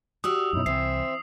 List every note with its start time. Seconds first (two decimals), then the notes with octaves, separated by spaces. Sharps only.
0.24 F#4 G4 D5 D#6 E6
0.53 F#2 B2 F#3 D#4 E4
0.66 C2 E3 C4 C5 E5 C7